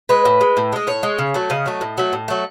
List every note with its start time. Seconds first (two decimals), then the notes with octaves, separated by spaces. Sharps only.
0.09 G#3 B4
0.25 A2
0.41 G#3
0.57 A2
0.72 G#3 D#5
0.87 A2 C#5
1.03 G#3
1.19 C#3
1.34 F#3 A3
1.50 C#3 D#5
1.66 F#3 A3
1.81 A2
1.98 F#3 A3
2.13 A2
2.28 F#3 A3